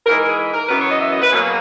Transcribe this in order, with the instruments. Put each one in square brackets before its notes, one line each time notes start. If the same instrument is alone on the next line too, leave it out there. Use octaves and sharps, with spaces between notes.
[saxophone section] G#2 E3 G#3 A#4
A#4
G#4
A#4
F#2 E3 B3 B4
C#5
D#5
E5
D#5
B4
B2 F#3 A#3 G#4
G#4